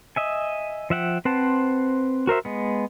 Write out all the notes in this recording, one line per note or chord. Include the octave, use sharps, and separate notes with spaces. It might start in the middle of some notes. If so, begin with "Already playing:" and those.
D#5 E5 G#5
F3 E5 F#5 G5
C4 B4 C5 F#5 A5
F#4 A#4 C5 E5
G#3 B3